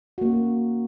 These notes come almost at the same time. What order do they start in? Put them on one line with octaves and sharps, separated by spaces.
F#4 A#3 C#4